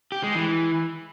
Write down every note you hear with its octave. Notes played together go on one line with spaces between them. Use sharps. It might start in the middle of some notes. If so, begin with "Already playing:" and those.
G4
G#3
E3